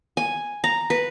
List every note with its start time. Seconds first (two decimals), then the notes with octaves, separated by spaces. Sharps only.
0.17 G#5
0.64 A#5
0.90 B4